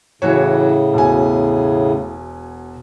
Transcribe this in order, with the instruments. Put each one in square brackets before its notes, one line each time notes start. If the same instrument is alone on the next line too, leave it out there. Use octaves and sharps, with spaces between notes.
[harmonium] A2 C#3 [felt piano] E3 F#4 C#5
[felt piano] E1 B2 G#5